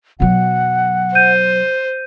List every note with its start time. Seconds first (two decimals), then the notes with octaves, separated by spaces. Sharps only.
0.20 B2 F#3 F#5
1.15 C5 G6 D#7